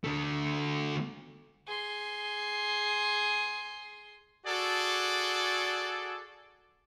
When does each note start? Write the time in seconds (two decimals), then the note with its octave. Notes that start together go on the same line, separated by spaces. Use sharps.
0.04 D3 A3
1.66 G#4 C6
4.46 F#4 G#4 A4 D5